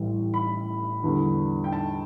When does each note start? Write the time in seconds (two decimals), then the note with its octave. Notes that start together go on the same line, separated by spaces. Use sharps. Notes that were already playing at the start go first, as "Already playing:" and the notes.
Already playing: A1 A2 E3 G3
0.34 B5
1.03 E2 D3 G3
1.64 G5
1.73 A5